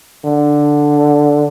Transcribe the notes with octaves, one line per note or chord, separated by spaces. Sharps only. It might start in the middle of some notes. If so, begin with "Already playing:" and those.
D3